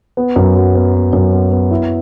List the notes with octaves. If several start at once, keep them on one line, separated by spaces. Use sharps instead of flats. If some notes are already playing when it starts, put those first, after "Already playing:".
B3
F#2
F#3
B3
B3
F#2
B3
B3
E4